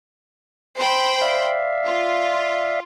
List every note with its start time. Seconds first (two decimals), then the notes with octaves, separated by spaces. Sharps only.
0.77 C5 G5 B5
1.21 D5 E5 F5
1.85 F4